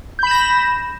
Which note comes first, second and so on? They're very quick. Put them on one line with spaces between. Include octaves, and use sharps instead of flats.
G6 B5 E7 A#6